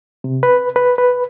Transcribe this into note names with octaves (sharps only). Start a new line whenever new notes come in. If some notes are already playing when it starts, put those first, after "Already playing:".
C3
B4
B4
B4